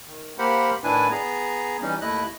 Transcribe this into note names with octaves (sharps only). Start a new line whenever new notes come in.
D#3
A#3 G4 A#4 C5 F#5 B5
A2 D#3 D4 E4 B4 G#5
B3 G#4 A#5
E3 G3 C#4 D#4
D#2 A3 E4 D#5 F#6